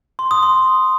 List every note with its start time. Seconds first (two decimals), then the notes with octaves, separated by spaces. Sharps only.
0.19 C6
0.31 D#6
0.43 C6